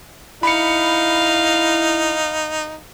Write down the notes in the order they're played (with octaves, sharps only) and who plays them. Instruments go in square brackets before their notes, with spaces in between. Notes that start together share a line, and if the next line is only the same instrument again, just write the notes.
[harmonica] D#4 [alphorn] E4 [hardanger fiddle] F5 [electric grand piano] B5 C#7